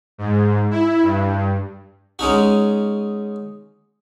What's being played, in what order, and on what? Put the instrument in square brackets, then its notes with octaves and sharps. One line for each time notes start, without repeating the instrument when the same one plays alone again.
[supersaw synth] G#2
E4
G2
[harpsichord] G#3 C#4 D#4 F#4